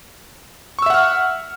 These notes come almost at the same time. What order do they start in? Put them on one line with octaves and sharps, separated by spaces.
C#6 E6 E5 F#5 F6